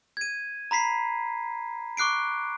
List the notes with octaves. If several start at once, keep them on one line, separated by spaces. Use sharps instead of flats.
G#6 D#7
A#5 B5 B6 C7
C#6 D6 F#6 C7 D7